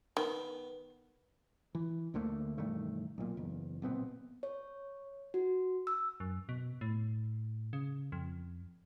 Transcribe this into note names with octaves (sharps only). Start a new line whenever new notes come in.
D#3 B3
E3
D2 D3 A3 A#3
E1 G2 D#3 A3
B1 A#2
F#1 E2
B1 A#2 B3 C4
C#5
F#4
E6
F#2
B2
A2
C#3
F2